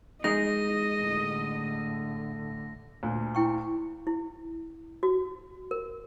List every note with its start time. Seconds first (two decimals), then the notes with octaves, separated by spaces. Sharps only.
0.24 G#3 D#4 D#5 A#6
1.01 A2 D3
3.03 D2 A#2
3.35 E4 G5 C#6
4.07 E4
5.03 F#4
5.71 A#4